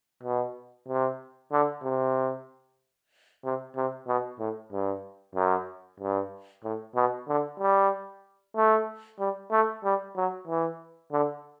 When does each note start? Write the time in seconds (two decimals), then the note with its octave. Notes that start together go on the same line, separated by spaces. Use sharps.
0.23 B2
0.88 C3
1.52 D3
1.83 C3
3.44 C3
3.76 C3
4.07 B2
4.39 A2
4.72 G2
5.35 F#2
6.00 G2
6.64 A2
6.95 B2
7.28 D3
7.60 G3
8.56 A3
9.19 G3
9.51 A3
9.84 G3
10.16 F#3
10.47 E3
11.12 D3